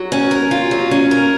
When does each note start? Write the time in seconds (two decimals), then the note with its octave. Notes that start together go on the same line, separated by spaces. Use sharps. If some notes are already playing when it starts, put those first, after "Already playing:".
Already playing: F#3
0.12 C#4
0.31 A#4
0.51 F4
0.71 F#3
0.91 C#4
1.11 A#4